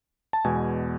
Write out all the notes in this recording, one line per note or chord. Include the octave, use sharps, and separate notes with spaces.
A5
E2 B2 G#3 G#5